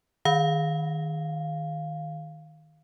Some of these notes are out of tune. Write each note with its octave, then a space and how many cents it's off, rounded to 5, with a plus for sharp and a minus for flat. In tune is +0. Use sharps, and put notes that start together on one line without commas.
D#3 +0 F5 +0